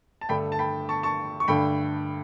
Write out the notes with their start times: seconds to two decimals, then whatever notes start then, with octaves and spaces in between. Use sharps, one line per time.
0.21 A5
0.29 G2 D3 A3 G5 B5
0.52 A5
0.59 G5 B5
0.89 A5 C#6
1.03 A5 C#6
1.40 C#6
1.48 G2 D3 A3 G5 B5